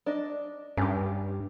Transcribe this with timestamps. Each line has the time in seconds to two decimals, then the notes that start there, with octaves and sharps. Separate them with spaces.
0.06 D4 D#5
0.77 G2 C#4 G4